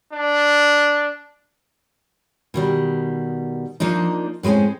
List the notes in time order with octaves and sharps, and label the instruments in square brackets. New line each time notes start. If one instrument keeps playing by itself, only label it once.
[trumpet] D4
[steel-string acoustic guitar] B2 D#3 G3
F3 A#3 D4 D#4
A2 G#3 A#3 C4 C#4